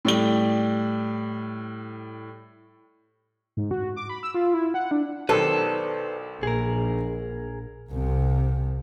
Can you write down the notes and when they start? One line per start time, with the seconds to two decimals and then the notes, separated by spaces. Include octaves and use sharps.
0.05 A2 G3 G7
3.57 G#2
3.71 F#4
3.96 D6
4.10 B5
4.23 E6
4.34 F4
4.54 E4
4.74 F#5
4.91 D4
5.29 B1 D#3 A4 B4 C5 D5
6.43 A#1 G#4 A#4
7.91 C2 C3